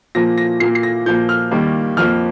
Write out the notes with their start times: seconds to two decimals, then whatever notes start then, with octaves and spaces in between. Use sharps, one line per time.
0.15 A#2 F3 A#3 A#6
0.38 A#6
0.60 A#2 A#3 C7
0.75 C7
0.83 A#6
1.06 A#2 F3 A#3 G6
1.29 F6
1.51 D#2 D#3 G3 A#3
1.97 F2 F3 A#3 F6